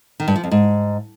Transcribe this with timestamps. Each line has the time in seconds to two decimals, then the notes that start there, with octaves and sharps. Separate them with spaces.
0.20 D#3
0.28 G2
0.36 F3
0.44 F2
0.51 G#2